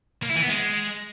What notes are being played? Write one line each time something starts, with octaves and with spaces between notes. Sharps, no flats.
A#3
E4
E3
B3
G#3